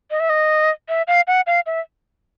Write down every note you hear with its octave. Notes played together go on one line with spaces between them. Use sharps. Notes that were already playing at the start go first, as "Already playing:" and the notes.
D#5
E5
D#5
E5
F5
F#5
F5
E5